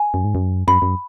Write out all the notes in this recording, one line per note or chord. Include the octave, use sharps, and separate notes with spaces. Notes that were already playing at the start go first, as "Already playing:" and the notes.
Already playing: G#5
F#2
G#2
F#2
F#2 B5
F#2